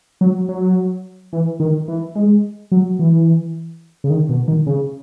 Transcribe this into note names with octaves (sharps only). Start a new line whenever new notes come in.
F#3
F#3
E3
D#3
E3
G#3
F#3
E3
C#3
D#3
B2
D#3
C#3